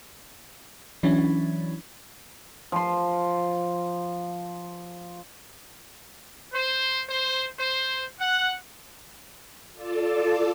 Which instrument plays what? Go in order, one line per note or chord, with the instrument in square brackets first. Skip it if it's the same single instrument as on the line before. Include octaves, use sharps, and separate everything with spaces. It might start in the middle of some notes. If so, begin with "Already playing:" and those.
[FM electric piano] E3 F#3 C#4 D4 E4
[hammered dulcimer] F3 C6
[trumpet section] C5
C5
C5
F#5
[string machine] F4 A4 D5 A5